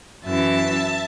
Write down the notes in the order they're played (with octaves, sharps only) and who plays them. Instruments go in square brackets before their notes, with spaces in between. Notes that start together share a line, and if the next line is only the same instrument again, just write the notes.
[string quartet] F#2 E3 E5 A5